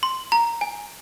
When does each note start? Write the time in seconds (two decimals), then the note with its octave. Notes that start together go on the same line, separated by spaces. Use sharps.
0.03 C6
0.32 A#5
0.61 G#5